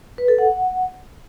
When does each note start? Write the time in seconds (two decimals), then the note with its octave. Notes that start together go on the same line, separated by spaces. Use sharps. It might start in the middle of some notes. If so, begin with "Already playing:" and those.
0.18 B4
0.28 A4
0.38 F#5